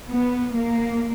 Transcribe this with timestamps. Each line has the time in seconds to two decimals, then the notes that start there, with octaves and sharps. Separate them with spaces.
0.10 B3
0.56 A#3